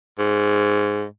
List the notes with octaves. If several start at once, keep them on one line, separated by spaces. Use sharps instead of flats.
G#2